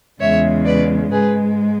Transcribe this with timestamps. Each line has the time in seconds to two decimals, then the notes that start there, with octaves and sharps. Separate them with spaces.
0.20 E2 C#3 G#3 C#5 E5
0.65 B4 D5
1.11 G#2 G#3 G#4 B4